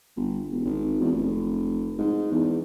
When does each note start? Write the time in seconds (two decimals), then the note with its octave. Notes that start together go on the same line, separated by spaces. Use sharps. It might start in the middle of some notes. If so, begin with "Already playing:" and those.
0.16 G1
0.51 E1
0.65 G#1
1.01 E2
1.13 F1
1.99 G#2
2.31 E2